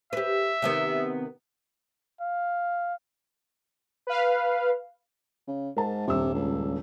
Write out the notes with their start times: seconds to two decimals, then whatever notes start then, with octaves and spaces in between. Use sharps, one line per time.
0.13 G4 B4 E5
0.62 C3 D#3 B3
2.21 F5
4.07 B4 F5
5.47 C#3
5.77 G#2 A#4 A5
6.07 D#1 G2 C3 E6
6.34 C#2